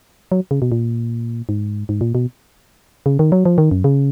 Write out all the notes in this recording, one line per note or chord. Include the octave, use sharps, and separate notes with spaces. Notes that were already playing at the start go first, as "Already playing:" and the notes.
F#3
C#3
B2
A#2
G#2
G#2
A#2
B2
C#3
D#3
F#3
F3
D#3
F#2
C#3